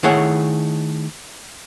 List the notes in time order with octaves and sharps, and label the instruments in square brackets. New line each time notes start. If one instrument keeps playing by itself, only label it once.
[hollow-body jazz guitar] D#3 A3 E4 G#4 C#5 F#5